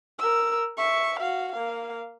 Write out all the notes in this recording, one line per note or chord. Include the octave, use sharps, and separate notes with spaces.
A#4 E6
E5 C#6
F#4 F5
A#3 F5